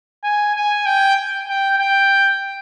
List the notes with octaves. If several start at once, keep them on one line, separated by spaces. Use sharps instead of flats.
G#5
G#5
G5
G5
G5